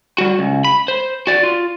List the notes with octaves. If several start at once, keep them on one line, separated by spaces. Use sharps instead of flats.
G3 F#4
C#2
B5
C5
F#4 D5
F4